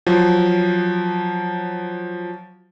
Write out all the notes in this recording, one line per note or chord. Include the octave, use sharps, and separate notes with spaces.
F3 F#3